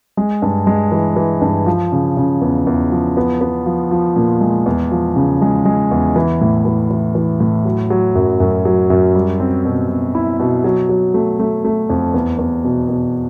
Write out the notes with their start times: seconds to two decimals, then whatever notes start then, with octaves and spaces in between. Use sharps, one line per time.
0.17 G#3
0.42 G2
0.67 G#3
0.92 E3
1.16 E3
1.42 G2
1.66 F3
1.92 C#3
2.17 C#3
2.42 E2
2.67 E2
2.92 F3
3.17 B3
3.41 B3
3.66 F3
3.91 F3
4.16 A#2
4.41 G#3
4.66 E2
4.91 F3
5.16 C#3
5.41 G#3
5.65 G#3
5.91 E2
6.16 E3
6.41 A2
6.65 E3
6.91 E3
7.15 E3
7.40 A2
7.65 F#3
7.90 F#3
8.15 F#2
8.40 F#2
8.65 F#3
8.90 F#2
9.15 G3
9.40 C4
9.65 B2
9.89 B2
10.15 E4
10.40 B2
10.64 F#3
10.89 F#3
11.14 A3
11.39 A3
11.65 A3
11.90 F2
12.14 E2
12.39 E2
12.64 B2
12.89 B2